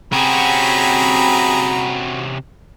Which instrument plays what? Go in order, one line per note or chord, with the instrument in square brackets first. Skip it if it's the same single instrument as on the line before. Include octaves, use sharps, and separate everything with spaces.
[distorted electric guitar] C3 C#4 [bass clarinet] C4 [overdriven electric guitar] F#4 [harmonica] G#4 A#5 B5